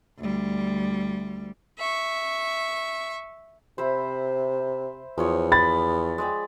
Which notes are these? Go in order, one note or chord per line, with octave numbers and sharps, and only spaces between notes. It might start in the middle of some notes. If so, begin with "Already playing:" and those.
D2 G3
E5 C#6
C3 C5 E5 B5
E2 F3 C#5
B5 A6
G#3 D5 G5